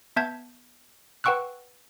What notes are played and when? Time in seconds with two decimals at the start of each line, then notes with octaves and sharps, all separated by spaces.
0.16 B3 E5 A5 G6 G#6
1.24 B4 F#5 G5 C#6 E6 F#6